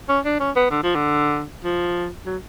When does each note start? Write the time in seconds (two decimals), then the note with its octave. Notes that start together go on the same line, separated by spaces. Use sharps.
0.09 C#4
0.25 D4
0.40 C#4
0.56 B3
0.71 D3
0.83 F3
0.95 D3
1.64 F3
2.26 F#3